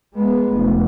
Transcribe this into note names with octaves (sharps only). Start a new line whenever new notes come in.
G#3 B3
F1